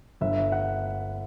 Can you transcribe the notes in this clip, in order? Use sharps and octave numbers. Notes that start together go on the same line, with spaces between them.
G1 E5
F#5